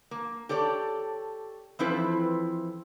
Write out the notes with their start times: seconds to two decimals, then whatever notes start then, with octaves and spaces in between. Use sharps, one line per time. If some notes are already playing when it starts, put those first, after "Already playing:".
0.11 A#3
0.49 G4 A4 C#5 D5
1.79 E3 F3 C4 E4 A4 B4